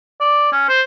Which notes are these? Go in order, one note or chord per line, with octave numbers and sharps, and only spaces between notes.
D5
C#4
C5